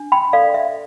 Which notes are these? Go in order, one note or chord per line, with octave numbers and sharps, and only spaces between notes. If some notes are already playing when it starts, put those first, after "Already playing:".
Already playing: D4
G5 B5
A4 D5 F5
E5